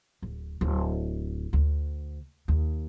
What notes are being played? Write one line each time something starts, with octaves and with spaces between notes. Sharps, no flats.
D1
D1
D2
D#2